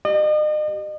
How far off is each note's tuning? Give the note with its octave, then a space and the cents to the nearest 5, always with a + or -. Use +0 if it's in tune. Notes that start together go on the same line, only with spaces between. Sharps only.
G4 -30 D#5 -40